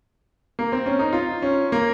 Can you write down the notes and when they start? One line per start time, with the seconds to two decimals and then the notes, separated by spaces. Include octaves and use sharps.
0.59 A#3
0.72 C4
0.86 C#4
0.99 D#4
1.13 F4
1.42 C#4
1.72 A#3